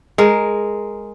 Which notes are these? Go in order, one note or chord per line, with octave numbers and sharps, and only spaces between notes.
G#3 A#4